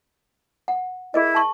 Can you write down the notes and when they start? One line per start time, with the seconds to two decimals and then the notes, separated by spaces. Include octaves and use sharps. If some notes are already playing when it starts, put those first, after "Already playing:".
0.68 F#5
1.14 E4 G#4 A#4 D#5
1.35 A5 C#6